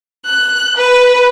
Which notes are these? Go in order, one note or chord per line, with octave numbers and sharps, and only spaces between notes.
F#6
B4